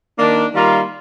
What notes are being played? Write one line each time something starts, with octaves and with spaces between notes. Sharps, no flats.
D#3 A#3 D4
D#3 G3 A#3 F4